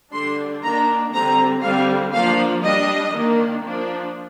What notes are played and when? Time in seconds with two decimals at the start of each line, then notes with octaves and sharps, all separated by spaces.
0.12 D3 G3 D4 C6
0.61 D#3 A#3 D4 A#5
1.12 D3 G3 C4 A#5
1.61 D3 G3 C4 F5
2.13 F3 A#3 D4 F5
2.62 G3 D4 D#5
3.12 D#3 A#3 D4
3.63 F3 A#3 D4